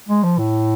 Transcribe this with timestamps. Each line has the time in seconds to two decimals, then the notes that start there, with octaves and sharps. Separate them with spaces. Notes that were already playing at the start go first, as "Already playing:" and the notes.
0.09 G#3
0.23 F3
0.38 A2